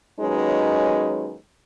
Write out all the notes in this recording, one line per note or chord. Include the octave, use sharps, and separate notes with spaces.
D#2 F#3 G#3 C#4 D#4 B4